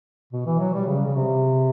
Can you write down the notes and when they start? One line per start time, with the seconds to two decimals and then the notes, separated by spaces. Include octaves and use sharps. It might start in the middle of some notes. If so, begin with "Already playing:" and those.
0.33 B2
0.46 E3
0.59 F#3
0.74 G3
0.87 C#3
1.05 C#3
1.16 C3